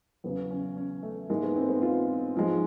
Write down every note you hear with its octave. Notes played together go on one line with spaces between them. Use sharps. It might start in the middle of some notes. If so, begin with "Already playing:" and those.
E2 C#3 F#3 B3
C#4
C#4
A3
G#2 E3 G#3 A#3
B3
C4
B3
F4
G#2 F3 G#3